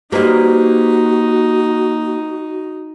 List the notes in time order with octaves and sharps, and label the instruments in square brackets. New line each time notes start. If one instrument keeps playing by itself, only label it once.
[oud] A#3 D#5 [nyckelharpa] D#4 [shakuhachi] F#4 [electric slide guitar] G4 B4 C5